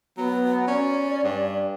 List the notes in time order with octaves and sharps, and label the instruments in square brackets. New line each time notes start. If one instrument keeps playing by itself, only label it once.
[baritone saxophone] F#3 [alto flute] B3
[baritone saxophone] C#4 [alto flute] D5
[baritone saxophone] G2